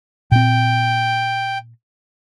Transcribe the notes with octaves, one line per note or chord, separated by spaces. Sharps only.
A#2 C4 G5